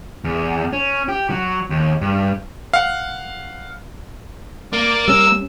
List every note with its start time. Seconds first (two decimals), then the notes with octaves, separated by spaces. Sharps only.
0.24 E2
0.73 C#4
1.09 G4
1.30 F#3
1.70 D#2
2.01 G2
2.73 F5 F#5
4.73 A#3 D5
5.08 G3 C#4 E6